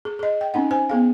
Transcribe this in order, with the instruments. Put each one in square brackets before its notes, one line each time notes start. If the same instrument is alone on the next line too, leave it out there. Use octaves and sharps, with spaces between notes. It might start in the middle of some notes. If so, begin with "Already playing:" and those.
[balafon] G#4
G#4 D#5
G5
C4 C#4 D#4 F#5
C5 G#5
B3 G#4 F5